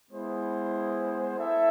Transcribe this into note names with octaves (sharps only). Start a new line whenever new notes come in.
G#3 B3 E4 G#4 C5
E4 A4 E5